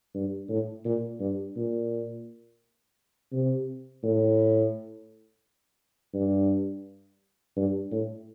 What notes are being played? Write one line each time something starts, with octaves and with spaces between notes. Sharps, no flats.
G2
A2
A#2
G2
A#2
C3
A2
G2
G2
A2